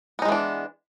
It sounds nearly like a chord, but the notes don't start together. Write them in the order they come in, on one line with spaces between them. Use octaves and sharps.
B3 D#4 G#3 E3 D4